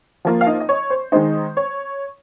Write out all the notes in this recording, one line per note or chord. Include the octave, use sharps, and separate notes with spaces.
F3 A#3 F4
F5
D#4 D#5
D#5
C#5
C5
D#3 G#3 D#4 C5
C#5